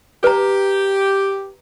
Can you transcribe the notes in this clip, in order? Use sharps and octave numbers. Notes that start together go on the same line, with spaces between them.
G4 B4 A#5